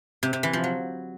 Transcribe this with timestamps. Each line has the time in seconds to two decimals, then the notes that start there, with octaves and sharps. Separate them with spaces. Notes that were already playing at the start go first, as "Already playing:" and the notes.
0.23 C3
0.33 C3
0.43 E3
0.53 F3
0.64 F#3